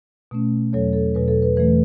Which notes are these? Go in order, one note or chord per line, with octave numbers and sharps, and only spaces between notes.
B2 A3 C#4
E2 B2 F#3 A4 C#5
A4
E2 B2 F#3 B4
A4
B4
E2 E3 A3 B4